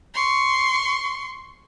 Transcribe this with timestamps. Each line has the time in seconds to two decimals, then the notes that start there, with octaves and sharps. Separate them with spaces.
0.14 C6 C#6